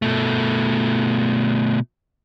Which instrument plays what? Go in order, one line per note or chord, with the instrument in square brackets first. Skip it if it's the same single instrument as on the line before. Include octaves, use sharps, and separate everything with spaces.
[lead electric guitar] B2 A3